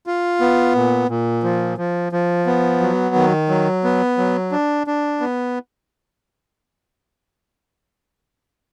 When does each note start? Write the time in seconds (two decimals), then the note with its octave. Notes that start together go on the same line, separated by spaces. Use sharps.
0.07 F4
0.40 B3
0.75 A#2
1.09 A#2
1.43 F3
1.78 F3
2.12 F3
2.46 B3
2.80 F#3
3.16 D#3
3.49 F#3
3.84 B3
4.18 F#3
4.52 D4
4.87 D4
5.20 B3